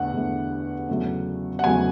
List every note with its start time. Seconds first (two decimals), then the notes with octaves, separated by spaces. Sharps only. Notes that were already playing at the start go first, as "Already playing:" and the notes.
Already playing: E2 D3 A3 F#5
0.12 E2 D3 A3
0.88 E2 C#3 F#3 A3
1.59 F#5
1.64 E2 C#3 F#3 A3 G#5